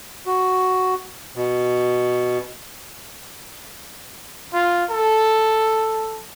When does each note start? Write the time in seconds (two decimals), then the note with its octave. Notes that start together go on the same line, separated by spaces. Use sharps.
0.26 F#4
1.36 B2
4.53 F4
4.90 A4